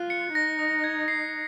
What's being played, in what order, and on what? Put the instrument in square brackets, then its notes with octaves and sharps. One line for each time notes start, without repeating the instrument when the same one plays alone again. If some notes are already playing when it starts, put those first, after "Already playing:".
Already playing: [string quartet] F4 [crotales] F#6
[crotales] C#7
[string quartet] D#4 [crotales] A#6
[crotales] D#6
G#6
C7